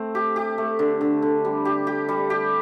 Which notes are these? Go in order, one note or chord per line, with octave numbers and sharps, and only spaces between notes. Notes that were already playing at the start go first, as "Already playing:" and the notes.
Already playing: A3 C4
G4
G4
A3
D3
D3
D3
G3
G4
G4
G3
G4